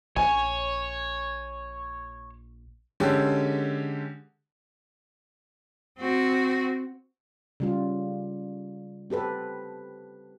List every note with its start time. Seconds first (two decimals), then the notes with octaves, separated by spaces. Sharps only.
0.16 A#1 C#5 G#5
3.00 D3 G#3 C#4 G4 A4
5.98 C4 F#4
7.60 C#3 G3 F4
9.10 C4 G4 A4 B4